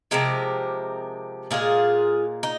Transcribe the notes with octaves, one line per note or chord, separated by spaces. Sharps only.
C3 F3 G#3 G4 A#4
A#2 G#3 F4 G#4
D#4